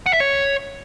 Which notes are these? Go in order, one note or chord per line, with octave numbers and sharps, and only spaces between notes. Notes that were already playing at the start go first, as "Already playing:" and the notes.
F#5
E5
C#5